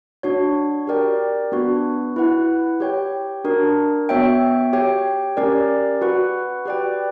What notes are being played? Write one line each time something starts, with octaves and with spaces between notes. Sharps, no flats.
D4 F#4 C#5
G4 A#4 D5 G5
B3 D4 F#4 B4
E4 B4 F#5
G4 C#5 G5
D4 F#4 A#4
B3 F#4 C#5 E5 G5
G4 C#5 G5
C#4 G4 A#4 D5
F#4 B4 F#5
G4 B4 D5 G5